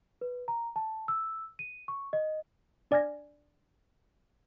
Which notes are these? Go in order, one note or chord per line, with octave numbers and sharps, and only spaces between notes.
B4
A#5
A5
E6
D#7
C#6
D#5
D4 D5 G#5 F6 G#6 A#6